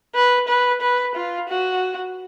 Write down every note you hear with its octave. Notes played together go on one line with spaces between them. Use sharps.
B4
B4
B4
F4
F#4